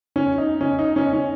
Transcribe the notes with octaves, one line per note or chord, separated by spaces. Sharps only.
C#4
D#4
C#4
D#4
C#4
C#4